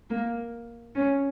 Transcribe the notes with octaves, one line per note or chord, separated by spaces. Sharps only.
A#3
C#4